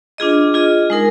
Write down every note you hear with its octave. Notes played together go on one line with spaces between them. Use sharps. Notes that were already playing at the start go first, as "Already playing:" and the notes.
D4 F4 G#4 D#5
F4 G#4 D#5
G#3 D#4 A#4